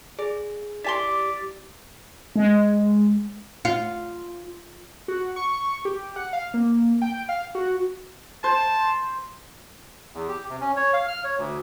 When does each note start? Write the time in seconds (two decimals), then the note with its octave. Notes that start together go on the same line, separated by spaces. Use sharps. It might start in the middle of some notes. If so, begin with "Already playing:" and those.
0.19 G#4 D5
0.84 E4 G4 D5 G#5 C6 B6
2.36 G#3
3.65 F4
5.08 F#4
5.36 C#6
5.85 G4
6.16 F#5
6.33 F5
6.54 A#3
7.02 G5
7.29 F5
7.55 F#4
8.44 C5 A5
10.14 E2
10.28 G4
10.49 C3
10.61 C#4
10.77 C#5
10.93 F5
11.08 F6
11.24 C#5
11.38 D2